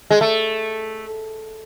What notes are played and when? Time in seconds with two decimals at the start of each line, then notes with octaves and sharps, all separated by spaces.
0.10 G#3
0.21 A3